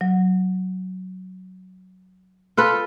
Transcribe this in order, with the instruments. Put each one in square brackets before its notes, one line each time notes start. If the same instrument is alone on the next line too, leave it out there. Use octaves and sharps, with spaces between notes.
[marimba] F#3
[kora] F4 A4 B4